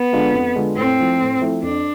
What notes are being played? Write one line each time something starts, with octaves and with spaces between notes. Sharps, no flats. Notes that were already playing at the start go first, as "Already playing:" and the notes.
Already playing: B3
D3 G#3 D4 F4
F2
D3 G#3 D4 F4
A2 C4
F3 A3 E4
A2
F3 A3 E4
F2 D4